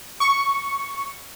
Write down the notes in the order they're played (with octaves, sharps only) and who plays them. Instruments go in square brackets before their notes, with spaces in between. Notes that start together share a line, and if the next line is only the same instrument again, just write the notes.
[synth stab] C#6